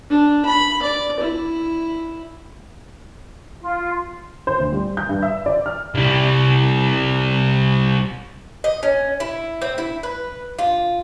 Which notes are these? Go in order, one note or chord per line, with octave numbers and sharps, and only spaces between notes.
D4
B5
D5
E4
F4
C5
D2
G3
G6
G2
E5
D5
F6
C2 G3
D#5
C#4
E4
C4
E4
B4
F4